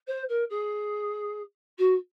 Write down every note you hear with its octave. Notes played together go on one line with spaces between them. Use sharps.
C5
A#4
G#4
F#4